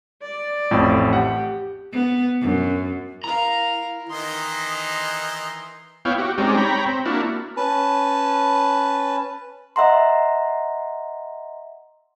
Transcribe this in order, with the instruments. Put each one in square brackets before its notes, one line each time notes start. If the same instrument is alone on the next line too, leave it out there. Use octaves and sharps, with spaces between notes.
[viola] D5
[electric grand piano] A1 F2 A2
[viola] G4 [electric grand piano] F#5
[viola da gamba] B3
F#2
[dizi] E4 [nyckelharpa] A#4 F5 [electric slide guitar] A#5
[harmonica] D#3 E3 D#4 [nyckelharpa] C6 [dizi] D#6
[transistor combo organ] B3 E4 C#5 F5 G5
F#4 G4
G#3 C4 C#4 D#4 G4 D5
C#5 G5 A#5 B5
C4
A#3 D4 E4 F#4
[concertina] C#4 B4 A5
[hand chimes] D#5 E5 F#5 A#5 C6